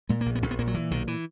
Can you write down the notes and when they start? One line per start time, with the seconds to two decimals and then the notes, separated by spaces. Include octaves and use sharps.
0.09 A#2 G#3
0.21 A#1 A#3
0.35 B3
0.42 A#1 C#4
0.51 B3
0.59 A#2 A#3
0.67 F#3
0.74 A#2 E3
0.91 B1 D#3
1.08 E3